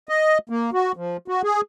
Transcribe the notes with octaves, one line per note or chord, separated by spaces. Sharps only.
D#5
A#3
F#4
F3
F#4
G#4